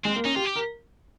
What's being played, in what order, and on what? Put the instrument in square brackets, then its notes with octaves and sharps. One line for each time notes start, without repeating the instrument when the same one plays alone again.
[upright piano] G#3 [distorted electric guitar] C4
[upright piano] A#3
[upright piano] C#4 [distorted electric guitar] D#4
[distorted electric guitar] F4 [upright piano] G4
[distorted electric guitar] G4
[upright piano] A#4